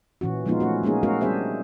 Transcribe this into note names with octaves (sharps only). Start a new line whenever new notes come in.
A#2 E3 C#4 F#4
F3 G#3 A#3 B3 D#4 F4
A3 C#4 F#4
G#3 A#3 B3 C#4 D#4 G#4
A3 C#4 F#4 A#4 F5
G3 C4 D4 G#4 C5 E5